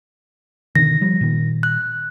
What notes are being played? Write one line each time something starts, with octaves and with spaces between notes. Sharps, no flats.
B2 D3 D#3 A#6
F3 G3
A#2 D#3
F#6